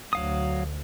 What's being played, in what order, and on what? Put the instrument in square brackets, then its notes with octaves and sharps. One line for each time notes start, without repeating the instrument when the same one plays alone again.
[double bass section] D2 [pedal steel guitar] F#3 F5 D#6